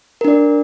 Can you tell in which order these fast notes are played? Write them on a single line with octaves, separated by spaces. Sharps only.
A#4 D4 D5